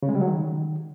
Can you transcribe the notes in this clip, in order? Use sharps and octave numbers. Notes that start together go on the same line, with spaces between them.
C#3
G#3
G3
F#3
D#3